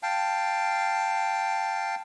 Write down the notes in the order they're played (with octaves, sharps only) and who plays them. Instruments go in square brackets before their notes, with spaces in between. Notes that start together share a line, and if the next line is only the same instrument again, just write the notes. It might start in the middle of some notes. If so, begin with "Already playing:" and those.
[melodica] F5 G5 A5